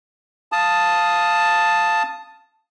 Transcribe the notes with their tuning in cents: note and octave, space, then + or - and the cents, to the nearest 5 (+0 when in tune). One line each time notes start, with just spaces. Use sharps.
F5 +0 A5 +0 D#6 +0